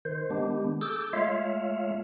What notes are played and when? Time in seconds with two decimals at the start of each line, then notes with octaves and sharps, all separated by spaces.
0.05 D#3 C5
0.30 D#3 G#3 B3 D4 G4
0.81 G#4 A4 D6 E6 G6
1.13 G#3 A3 F4 C#5 E5 F5